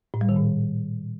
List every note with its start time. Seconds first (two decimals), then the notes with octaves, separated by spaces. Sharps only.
0.14 A2
0.21 G3
0.29 D#3
0.36 A#2